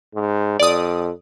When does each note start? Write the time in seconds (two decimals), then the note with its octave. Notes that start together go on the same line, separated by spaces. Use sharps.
0.15 G#2
0.60 F2 D5 D#6